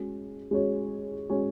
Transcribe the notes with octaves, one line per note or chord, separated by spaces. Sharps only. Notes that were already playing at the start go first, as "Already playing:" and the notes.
Already playing: G#3 C#4 F#4
G#3 C#4 F#4 C#5
G#3 C#4 F#4 C#5